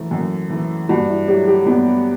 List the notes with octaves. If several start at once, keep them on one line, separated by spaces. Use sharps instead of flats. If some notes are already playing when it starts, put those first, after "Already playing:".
Already playing: F#2 E3 A3
F#2
E3 A3
G2 F#4
E4
F#3 A3 G4
G4
G2 B3